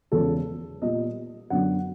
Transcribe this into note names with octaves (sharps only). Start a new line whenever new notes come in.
E2 C#3 F3 G#3 A4
A#2 G3 B3 D#5
F#2 D3 F#3 B3 D4 F#5